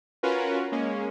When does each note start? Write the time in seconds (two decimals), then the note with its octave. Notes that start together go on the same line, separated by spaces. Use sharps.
0.23 C#4 F4 F#4 A#4 B4
0.72 G#3 A#3 C#4